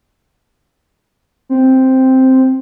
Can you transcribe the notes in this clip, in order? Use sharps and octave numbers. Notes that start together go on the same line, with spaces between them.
C4